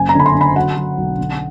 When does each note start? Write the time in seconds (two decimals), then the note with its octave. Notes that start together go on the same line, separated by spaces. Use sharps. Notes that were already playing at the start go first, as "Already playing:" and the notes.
Already playing: F#1 G#5
0.09 A#5
0.15 D3 B5
0.26 C6
0.35 D3
0.41 B5
0.56 F#3 F#5
0.76 F#3
0.98 B1
1.19 D3